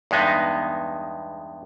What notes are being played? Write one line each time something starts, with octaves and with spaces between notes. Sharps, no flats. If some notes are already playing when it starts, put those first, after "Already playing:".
E2 G2 G#3 B3 D#4